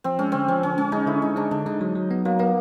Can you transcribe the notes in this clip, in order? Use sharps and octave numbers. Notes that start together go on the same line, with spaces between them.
F3 C4
G#3 C#4
D3 C4
F3 C#4
D3 C#4
G#3 C#4
G#3 D#4
D3 E4
G#3 D#4
G#3 D4
D3 D4
G#3 D#4
F#3
F#3
B3
F#3 A#3
A#3 B3